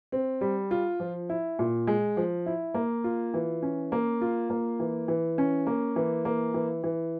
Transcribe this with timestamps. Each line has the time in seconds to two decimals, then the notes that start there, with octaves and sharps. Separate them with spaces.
0.12 C4
0.41 G3
0.71 F4
1.00 F3
1.29 E4
1.59 A#2
1.87 G#3
2.17 F3
2.46 E4
2.74 A#3
3.04 F4
3.34 E3
3.62 C#4
3.92 A#3
4.21 F4
4.50 A#3
4.80 E3
5.08 E3
5.38 C#4
5.67 A#3
5.96 E3
6.25 A#3
6.54 E3
6.84 E3